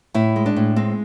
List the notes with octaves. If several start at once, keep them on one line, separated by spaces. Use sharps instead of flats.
A2 E4
G#3
D4
A2
G#3 C4